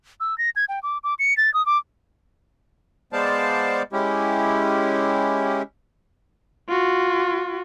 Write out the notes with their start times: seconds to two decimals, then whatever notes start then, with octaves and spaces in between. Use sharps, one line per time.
0.20 E6
0.38 A#6
0.56 G#6
0.69 G5
0.83 D6
1.04 D6
1.19 C#7
1.37 A6
1.54 D#6
1.66 D6
3.13 G#3 B3 C5 D5 F5 A5
3.93 G#3 C#4 E4 G4
6.69 F4 F#4